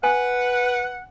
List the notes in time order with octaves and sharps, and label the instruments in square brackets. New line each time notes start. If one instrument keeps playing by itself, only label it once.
[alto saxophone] B4 [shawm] F#5 [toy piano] G#5